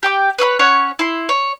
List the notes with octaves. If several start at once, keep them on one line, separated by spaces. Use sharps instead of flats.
G4 G5 D6
B4 C#5 E5 B5
C#4 C#5 F#5
E4 C6
C#5